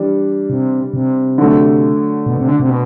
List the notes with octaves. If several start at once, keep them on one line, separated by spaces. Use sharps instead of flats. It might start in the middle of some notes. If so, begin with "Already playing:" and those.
Already playing: E3 G3 D4
C3
C3
D3 F#3 A3
B2
C3
D3
C3
B2